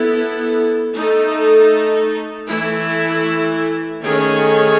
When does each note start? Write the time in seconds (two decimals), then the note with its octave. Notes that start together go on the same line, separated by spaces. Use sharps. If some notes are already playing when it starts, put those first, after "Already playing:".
Already playing: B3 E4 A4
0.95 A3 D#4 A4
2.49 E3 A3 E4
4.02 D#3 A3 C#4 G#4 C#5